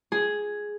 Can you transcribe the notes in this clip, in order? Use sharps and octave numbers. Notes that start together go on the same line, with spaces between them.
G#4